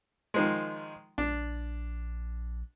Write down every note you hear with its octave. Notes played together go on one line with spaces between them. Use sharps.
D#3 F3 G#3
A#1 D4